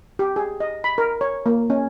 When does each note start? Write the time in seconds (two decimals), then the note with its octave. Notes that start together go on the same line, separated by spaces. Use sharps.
0.19 G4
0.36 G#4
0.60 D#5
0.84 B5
0.98 A#4
1.21 C#5
1.46 A#3
1.70 C#4